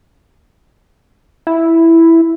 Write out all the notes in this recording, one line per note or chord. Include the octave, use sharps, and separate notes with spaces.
E4